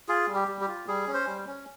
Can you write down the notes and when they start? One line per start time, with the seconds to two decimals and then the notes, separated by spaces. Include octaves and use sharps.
0.08 F4 G#4
0.28 G3
0.35 G4
0.48 G3
0.61 G4
0.68 F4
0.87 G3 G#4
1.07 C#4
1.14 C5
1.27 G3
1.47 C#4